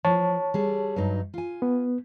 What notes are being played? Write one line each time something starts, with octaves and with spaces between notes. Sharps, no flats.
F3 C#5 A5
G3 G#4 A4
G2 F#3 D#4
F4 G#5
B3